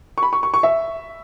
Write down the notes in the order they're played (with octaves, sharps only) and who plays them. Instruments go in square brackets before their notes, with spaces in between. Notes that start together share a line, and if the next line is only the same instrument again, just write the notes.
[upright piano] C#6
B5
C#6
C#6
C#6
E5